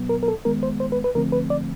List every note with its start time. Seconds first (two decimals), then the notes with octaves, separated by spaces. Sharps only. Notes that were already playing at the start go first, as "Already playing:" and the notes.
Already playing: B2 F#3 B3
0.09 A#4
0.23 A#4
0.28 A4
0.45 D#3 G#3 B3 A#4
0.63 C5
0.80 C5
0.92 B4
1.04 B4
1.15 D3 F3 A3 C4 A#4
1.32 B4
1.50 D5